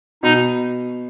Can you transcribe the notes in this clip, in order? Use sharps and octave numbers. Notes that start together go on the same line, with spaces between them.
B2 D#4